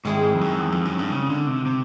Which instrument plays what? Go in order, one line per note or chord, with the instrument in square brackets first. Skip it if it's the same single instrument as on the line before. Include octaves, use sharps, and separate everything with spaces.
[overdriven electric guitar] G#2 [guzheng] D#3 G#3 C4 E4
[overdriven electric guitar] G#2
F2
F#2
E2
F2
F#2
G2
C#3
D3
C3
C3